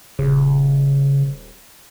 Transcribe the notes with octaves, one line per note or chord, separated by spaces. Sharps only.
D#1 C#3